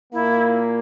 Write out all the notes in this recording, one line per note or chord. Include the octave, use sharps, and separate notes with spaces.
A#2 A#3 E4